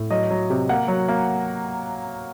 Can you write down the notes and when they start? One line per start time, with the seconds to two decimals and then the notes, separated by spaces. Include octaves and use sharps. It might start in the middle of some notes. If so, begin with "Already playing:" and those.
Already playing: A2
0.11 F#3 D#5
0.31 F#3
0.50 C3
0.69 A#3 F#5
0.88 F#3
1.08 A#3